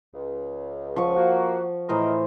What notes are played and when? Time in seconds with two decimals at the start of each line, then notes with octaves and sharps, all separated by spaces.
0.14 C#2
0.96 F3 F#5 C#6
1.16 A#3 F#4
1.89 A2 E3 A#4 C5 D#5